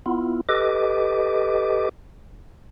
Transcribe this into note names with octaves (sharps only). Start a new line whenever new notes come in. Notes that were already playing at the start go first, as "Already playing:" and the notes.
B3 E4 F4
G4 A4 B4 D#5 D6